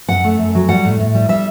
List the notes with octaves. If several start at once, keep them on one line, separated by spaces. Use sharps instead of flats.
F#2 F#5
A3
F#2
F#3
G3 F#5
A2
A2
G3
G3 E5